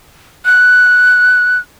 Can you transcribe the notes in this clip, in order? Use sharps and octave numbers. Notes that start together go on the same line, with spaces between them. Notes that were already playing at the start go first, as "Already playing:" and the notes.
F#6